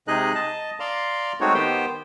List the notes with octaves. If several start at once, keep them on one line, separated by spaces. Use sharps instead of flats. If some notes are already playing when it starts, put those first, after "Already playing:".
C3 G#3 D#4 G#4 D#5 F#6
D#5 A5
D5 F5 A#5 C6
G#3 A3 C4 D#4 F#4 C#5
D#3 B3 G4 C5 G5